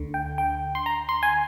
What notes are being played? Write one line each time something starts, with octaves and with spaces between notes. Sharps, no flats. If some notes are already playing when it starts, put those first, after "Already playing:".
Already playing: D2 D3
G5
G5
C6
A#5
C6
G#5